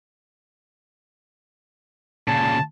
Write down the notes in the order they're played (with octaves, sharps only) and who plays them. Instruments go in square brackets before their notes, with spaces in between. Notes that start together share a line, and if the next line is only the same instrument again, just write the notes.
[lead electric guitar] A#2 C#3 [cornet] A5